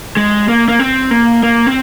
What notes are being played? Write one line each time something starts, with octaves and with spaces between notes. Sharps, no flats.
G#3
A#3
A#3
C4
A#3
A#3
C4